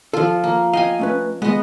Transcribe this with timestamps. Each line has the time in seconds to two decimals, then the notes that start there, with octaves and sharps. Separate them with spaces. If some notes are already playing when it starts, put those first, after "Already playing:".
0.13 F3 F4 A4
0.44 A#3
0.73 D#5 F5 G5 G#5
0.99 A3 C#4 B4
1.42 G#3 B3 D#5